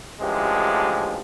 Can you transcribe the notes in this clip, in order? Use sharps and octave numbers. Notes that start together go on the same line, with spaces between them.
A1 D2 F3 G#3 G4